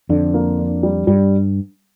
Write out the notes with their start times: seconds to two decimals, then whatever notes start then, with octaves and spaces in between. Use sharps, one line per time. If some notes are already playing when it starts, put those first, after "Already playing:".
0.09 F2 D3
0.34 A#3
0.59 D4
0.83 G3
1.07 G2 G3